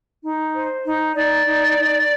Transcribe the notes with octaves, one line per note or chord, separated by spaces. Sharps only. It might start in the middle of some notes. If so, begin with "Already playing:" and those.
D#4
C5
D#4
D#4 D5
D#4
D#4